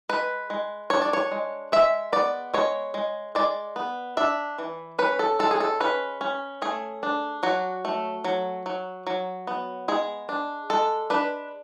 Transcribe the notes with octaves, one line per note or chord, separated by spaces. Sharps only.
G#3 B4
G#3
D4 C#5
D5
C#5
G#3
G#3 E5
B3 D5
G#3 C#5
G#3
G#3 D5
B3
D4 E5
E3
C#4 B4
A4
G#3 A4
G#4
A4
C#4 B4
C#4
A3 G#4
D4
F#3 F#4
A3
F#3
F#3
F#3
B3
G#3 G#4
D4
G#3 A4
D4 B4